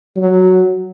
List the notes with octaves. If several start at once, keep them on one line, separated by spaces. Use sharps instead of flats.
F#3